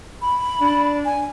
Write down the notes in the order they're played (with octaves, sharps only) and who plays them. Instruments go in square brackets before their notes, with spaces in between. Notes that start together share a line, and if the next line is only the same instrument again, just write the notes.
[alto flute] B5
[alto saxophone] D4
[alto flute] G#5